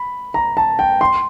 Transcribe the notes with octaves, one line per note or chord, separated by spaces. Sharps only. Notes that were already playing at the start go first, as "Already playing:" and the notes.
Already playing: B5
A#5
A5
G5
C6